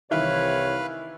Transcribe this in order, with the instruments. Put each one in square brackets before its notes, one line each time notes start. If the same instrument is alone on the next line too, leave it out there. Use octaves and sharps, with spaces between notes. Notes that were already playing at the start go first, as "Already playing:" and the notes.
[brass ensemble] C2 C3 C#5 [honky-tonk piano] D#3 E3 E4 [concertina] B4 F5